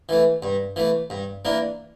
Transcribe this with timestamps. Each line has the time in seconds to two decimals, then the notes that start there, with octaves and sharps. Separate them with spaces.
0.09 E3 A3
0.43 G2
0.76 E3 A3
1.10 G2
1.45 E3 A#3 D4